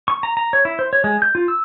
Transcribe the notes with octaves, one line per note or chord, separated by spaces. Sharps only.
C#6
A#5
A#5
C#5
E4
C5
C#5
G#3
G6
F4
E6